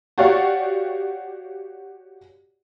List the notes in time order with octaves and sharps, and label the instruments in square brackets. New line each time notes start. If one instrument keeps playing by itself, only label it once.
[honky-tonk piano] F#4 G4 C#5 D5 F5 F#5